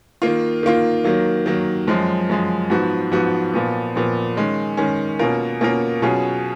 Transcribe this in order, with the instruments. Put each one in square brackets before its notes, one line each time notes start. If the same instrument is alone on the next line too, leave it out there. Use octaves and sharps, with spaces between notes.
[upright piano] D#3 A#3 F4
D#3 A#3 F4
D#3 F#3 A#3
D#3 F#3 A#3
F#2 F3 G#3
F#2 F3 G#3
G#2 F3 B3 F#4
G#2 F3 B3 F#4
A#2 F3 B3
A#2 F3 B3
D#3 G#3 C#4
D#3 G#3 C#4
B2 A#3 C#4 F4 A#4
B2 A#3 C#4 F4 A#4
B2 F#3 C#4 F4 G#4